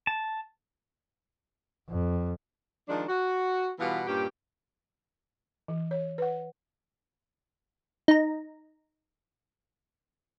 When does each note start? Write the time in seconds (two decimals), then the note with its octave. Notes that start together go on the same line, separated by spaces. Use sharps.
0.07 A5
1.89 F2
2.88 D#3 F3 G#3 D4
3.08 F#4
3.79 B2 E3 G3 B3 F4 F#5
4.07 G2 A#2 C#4 G4
5.68 E3
5.91 C#5
6.18 B4 F#5
8.08 D#4 A#5